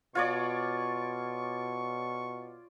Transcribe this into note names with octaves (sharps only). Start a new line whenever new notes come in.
B2 F4 C#5 D5 C#6